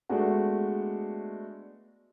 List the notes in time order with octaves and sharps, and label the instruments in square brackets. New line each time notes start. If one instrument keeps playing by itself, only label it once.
[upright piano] G#3 A3 B3 D4 F#4